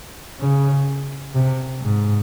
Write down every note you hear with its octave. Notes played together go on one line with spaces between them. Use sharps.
C#3
C3
G#2